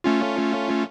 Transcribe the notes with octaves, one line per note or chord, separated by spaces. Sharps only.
A3 C#4 F4